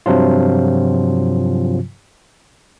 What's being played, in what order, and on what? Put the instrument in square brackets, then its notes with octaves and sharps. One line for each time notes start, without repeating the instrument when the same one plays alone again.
[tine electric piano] G2 C3 F3 F#3 F4